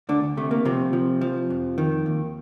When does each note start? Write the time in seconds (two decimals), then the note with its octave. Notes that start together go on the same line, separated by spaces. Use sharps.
0.09 D2 D3 D4
0.37 C3 A3
0.51 A#3
0.65 C3 F3 C4
0.93 F3
1.21 F3
1.50 F2
1.78 D#3
2.06 D#2